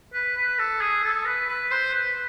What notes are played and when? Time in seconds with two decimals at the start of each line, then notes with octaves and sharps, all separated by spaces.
0.13 B4
0.36 B4
0.59 A4
0.81 G#4
1.04 A4
1.25 B4
1.48 B4
1.71 C5
1.94 B4